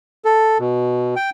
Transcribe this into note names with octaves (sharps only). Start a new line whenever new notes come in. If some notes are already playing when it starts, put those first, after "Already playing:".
A4
B2
G5